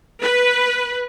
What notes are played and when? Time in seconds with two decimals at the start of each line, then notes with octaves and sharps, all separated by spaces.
0.22 B4